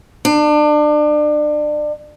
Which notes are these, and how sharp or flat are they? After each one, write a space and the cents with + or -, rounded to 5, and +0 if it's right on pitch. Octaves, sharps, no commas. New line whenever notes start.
D4 +30